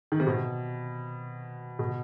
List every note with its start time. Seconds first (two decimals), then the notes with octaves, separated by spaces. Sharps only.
0.12 D#3
0.20 C3
0.27 B2
1.79 B2